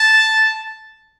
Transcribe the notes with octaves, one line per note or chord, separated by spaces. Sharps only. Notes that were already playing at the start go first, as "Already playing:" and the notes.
Already playing: A5